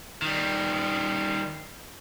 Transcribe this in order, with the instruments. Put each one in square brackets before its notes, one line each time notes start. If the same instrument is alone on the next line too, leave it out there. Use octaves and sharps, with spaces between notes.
[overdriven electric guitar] D#3 G3